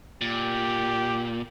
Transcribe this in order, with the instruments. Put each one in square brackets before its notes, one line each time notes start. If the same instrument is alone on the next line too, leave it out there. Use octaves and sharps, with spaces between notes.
[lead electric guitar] A#2 [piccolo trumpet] G4